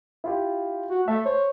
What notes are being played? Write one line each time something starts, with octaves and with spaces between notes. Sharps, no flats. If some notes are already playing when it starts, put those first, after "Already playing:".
E4 F4 G4
F#4
A3 E5 A5
C5 C#5